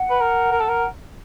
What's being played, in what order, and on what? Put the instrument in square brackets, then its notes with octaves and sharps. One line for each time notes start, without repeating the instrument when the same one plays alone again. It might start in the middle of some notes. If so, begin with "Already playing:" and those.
Already playing: [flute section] F#5
[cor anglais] B4
A#4
A#4
A4
A#4